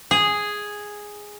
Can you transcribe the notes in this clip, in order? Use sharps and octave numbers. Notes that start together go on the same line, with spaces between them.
G#4